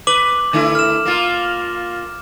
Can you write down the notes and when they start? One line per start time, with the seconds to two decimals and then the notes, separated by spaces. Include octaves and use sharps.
0.07 B4 D6 F#7
0.53 D3 A3 E4
0.75 F6 E7
1.06 A#3 F4